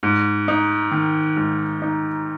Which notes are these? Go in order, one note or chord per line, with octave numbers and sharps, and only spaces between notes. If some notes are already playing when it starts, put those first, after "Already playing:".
G#2
D#4
D#3
G#2
D#4